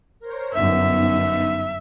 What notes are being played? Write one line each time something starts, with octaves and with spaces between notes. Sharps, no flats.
A#4 C5 C#5
G1 F#2 B3 D#4 E5